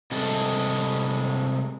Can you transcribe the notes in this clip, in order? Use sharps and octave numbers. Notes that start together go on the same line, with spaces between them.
C3 G3 G#3 A4